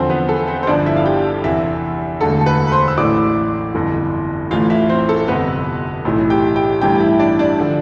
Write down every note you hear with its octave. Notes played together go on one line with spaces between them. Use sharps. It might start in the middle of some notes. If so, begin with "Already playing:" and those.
Already playing: E2 D3 F3 C4 C5
B3 B4
A4
C4 C5
C5
G1 G2 D3 F3 D4 D5
E4 E5
F5
G4 G5
E2 C3 E3 E4 E5
E1 D2 D3 A4 A5
A5
B4 B5
B5
C5 C6
E6
A1 A2 E3 D5 D6
G1 F2 E3
A1 A2 E3 F4 F5
E4 E5
C4 C5
A4
G1 F2 C3 B3 B4
B1 A2 E3
G4 G5
G4 G5
A1 G2 E3 G4 G5
E4 E5
D4 D5
D4 D5
D3 F3